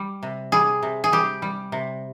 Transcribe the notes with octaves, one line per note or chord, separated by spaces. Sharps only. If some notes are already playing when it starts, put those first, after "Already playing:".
Already playing: G3
C3
G3 G#4
C3
G#4
G3 G4
G3
C3